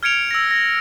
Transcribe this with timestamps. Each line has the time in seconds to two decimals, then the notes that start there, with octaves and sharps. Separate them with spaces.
0.03 F6 G#6 C#7 D7 F7
0.31 E6 A#6
0.51 A#6